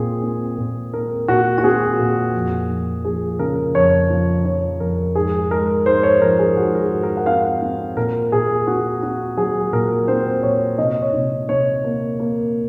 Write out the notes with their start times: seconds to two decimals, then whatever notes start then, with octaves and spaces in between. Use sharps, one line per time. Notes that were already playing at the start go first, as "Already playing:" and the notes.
Already playing: A#2 C4 G#4
0.23 C4
0.58 A#2
0.93 C4 A#4
1.28 A#2 F#4
1.58 F#4
1.64 C4 G#4
1.99 A#2
2.34 F2
2.69 F3
3.05 F3 G#4
3.39 C#3 A#4
3.75 F2 C#5
4.10 F3
4.45 F3 C#5
4.80 F2 A#4
5.15 G#2 G#4
5.51 G#3 A#4
5.86 G#2 C5
6.03 C#5
6.21 F3 A#4
6.39 G#4
6.56 G#2 F#4
6.75 A#4
6.80 G#4
6.92 G#2
7.03 A#4
7.17 F#5
7.26 C4 F5
7.62 C4
7.97 A#2 A#4
8.32 A#2 G#4
8.67 C4 F#4
9.02 C4 F#4
9.37 F#3 G#4
9.73 A#2 A#4
10.08 C4 C5
10.43 A#2 C#5
10.78 C3 D#5
11.02 C#5
11.13 C3
11.49 C3 C#5
11.84 A#3
12.20 A#3